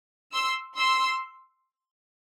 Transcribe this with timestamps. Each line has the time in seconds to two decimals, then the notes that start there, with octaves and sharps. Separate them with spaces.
0.34 C6 E6
0.78 C6 E6